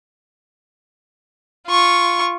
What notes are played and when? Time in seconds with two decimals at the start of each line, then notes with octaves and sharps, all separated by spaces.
1.67 F4 C#6